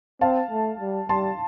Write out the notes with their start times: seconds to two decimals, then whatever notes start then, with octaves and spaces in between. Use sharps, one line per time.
0.21 C4 F5 A5
0.51 A3
0.80 G3
1.09 G3 A5 C6